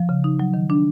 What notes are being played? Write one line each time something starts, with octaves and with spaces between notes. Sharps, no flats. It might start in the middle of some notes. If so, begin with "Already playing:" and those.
Already playing: F3
C#3
D#4
F#3
D#3
D4